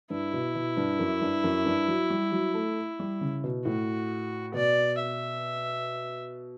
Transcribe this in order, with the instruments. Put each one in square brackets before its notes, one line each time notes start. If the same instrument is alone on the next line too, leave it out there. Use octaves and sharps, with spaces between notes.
[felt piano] G2 [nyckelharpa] E4
[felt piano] B2
B2
G2
F#2
G2
F#2
G2
F#3
G3
F#3
A3
G3
C#3
B2
[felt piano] A2 [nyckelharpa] F#4
[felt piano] B2 [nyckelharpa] D5
[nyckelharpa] E5